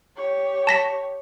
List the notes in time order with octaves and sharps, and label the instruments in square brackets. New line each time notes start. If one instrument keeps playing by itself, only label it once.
[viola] G4 C#5
[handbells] A5 A#6 B6